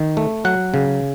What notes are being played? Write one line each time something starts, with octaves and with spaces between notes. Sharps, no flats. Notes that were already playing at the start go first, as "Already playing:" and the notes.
Already playing: D#3
A3
F#3 F#5
C#3